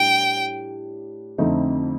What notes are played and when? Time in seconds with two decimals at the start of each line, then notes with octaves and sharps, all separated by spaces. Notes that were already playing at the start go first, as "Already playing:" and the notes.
Already playing: A2 G3 D4 G5
1.38 F2 D3 A3 C4 D#4